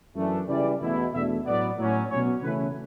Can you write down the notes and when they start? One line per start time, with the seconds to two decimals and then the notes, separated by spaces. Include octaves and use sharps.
0.15 F#2 E3 A3 D4
0.48 C#3 E3 G3 D5
0.80 E2 B2 A3 E4
1.13 E2 B2 A3 D4 E5
1.46 A2 F#3 B3 D5
1.77 A2 F#3 C#4
2.10 B2 F#3 C#4 C#5
2.42 C#3 E3 A3 C#4 E4 B4